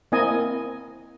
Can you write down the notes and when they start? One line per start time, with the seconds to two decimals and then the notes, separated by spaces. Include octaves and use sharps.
0.12 A#3 C4 E4 D#5 G#5